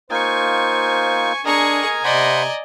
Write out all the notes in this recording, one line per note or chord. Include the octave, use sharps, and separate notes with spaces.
A#3 D#4 F4 C5 G#5 C#6
D4 G#4 A#4 D#5 G#5 A#5 C#6
C3 C5 D5 D#5 F#5 B5